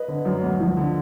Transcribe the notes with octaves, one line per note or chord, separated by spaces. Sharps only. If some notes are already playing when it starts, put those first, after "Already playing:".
Already playing: B4 D#5
D3
F#2
D2
F3
D3